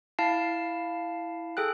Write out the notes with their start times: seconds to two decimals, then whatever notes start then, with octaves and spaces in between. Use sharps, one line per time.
0.19 E4 F5 A5 C7
1.57 G#4 A4 G5 F#6